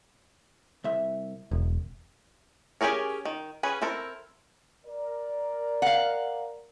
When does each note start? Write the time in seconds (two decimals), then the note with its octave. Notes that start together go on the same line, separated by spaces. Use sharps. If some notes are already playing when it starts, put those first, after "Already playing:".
0.84 C2 E5
1.51 E1 F#2
2.81 C#4 G4 G#4 A#4 C#5
3.25 D#3
3.63 C#4 G#4 B4
3.82 C4 E4 A4 A#4
4.86 A#4 D5
5.82 F5 F#5